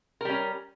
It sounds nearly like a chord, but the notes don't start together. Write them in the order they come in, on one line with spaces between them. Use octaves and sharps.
A#4 G3 C#4